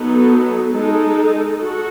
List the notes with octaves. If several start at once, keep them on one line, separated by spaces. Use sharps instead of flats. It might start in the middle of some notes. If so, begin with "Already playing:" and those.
Already playing: F#3 B3 D#4 A4
G#3 D#4 A4
F#4 A4